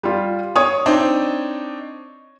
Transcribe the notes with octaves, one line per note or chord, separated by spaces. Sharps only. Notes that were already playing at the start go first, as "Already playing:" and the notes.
G3 F4
C#5 D#6
C4 D4 D#4